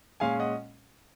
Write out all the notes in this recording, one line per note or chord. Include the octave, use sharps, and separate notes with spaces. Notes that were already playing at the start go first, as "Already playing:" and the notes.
A#2 G#3 C#4 F5 G#5
D#5 F#5